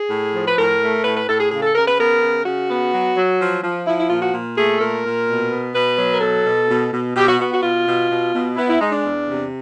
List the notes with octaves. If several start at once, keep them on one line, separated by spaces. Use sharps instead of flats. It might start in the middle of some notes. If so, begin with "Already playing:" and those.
Already playing: G#4
A2
F3
B4
A2 A#4
A3
A2 B4
B4
A2 A4
G#4
C#3 G#4
A4
C#3 A#4
B4
B3 A#4
C#3
C#3 F#4
B3
F#3
F#3
F3
F3
F3 E4
E4
A#2 F4
F#4
A#2
A3 G#4
A4
A#2 A#4
A#2
B2
B3
B2 B4
F#3
A#4
B2 A4
B2
B2
B2
B2 G4
F#4
B3 F#4
F#4
B2 F4
B2
B2
B2
B3 E4
E4
G#3 D#4
D4
E2
C3